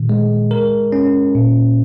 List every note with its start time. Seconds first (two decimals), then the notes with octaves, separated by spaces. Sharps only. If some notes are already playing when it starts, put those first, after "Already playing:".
Already playing: A#2 D#3
0.09 G#3
0.51 A#4
0.92 C#4
1.35 A#2